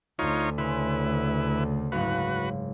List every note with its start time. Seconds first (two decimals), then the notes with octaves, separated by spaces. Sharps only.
0.19 D2 D#4 F4 C#5
0.58 C#3 E4 B4 C6 F6
1.92 F#1 G#2 F#4 B4 F5